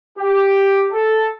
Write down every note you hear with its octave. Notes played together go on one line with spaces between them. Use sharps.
G4
A4